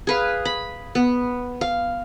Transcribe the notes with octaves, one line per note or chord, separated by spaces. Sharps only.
G#4 B4 F5
B5
B3
F5